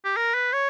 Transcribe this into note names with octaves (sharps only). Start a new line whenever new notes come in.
G4
A#4
B4
C#5